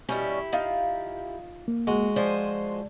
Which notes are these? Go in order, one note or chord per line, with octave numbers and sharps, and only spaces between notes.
B2 G3 C#4 E4 G4
D#4 F4 F5
A#3
G#3 F#4
F3 C5 D5 G#5